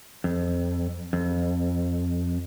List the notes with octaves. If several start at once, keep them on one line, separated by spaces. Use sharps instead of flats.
F2
F2